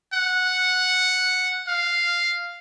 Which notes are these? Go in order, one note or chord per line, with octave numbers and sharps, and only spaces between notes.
F#5
F5